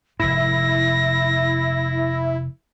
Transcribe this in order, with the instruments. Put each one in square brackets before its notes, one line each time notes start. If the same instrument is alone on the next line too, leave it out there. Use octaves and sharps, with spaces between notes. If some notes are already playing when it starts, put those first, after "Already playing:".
[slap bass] F1 G#2 [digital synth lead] E4 [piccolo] A#6